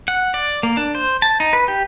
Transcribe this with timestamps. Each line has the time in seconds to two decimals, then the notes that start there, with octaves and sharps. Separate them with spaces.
0.08 F#5
0.34 D5
0.63 A#3
0.77 D4
0.95 C5
1.22 A5
1.40 D#4
1.53 B4
1.68 G4